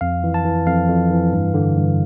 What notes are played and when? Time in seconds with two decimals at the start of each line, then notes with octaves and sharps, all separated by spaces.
0.01 F2 F5
0.24 E3
0.34 A5
0.45 E3
0.67 F2 F5
0.89 F2
1.11 E3
1.33 G2
1.54 D3
1.76 G2